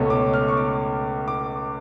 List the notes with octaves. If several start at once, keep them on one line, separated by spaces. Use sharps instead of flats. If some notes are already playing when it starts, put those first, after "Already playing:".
Already playing: C#2 B2 A3 C#4
D6
F6
C#6
D6
D6